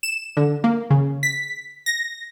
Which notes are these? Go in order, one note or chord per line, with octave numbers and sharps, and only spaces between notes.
E7
D3
A#3
C#3
B6
A#6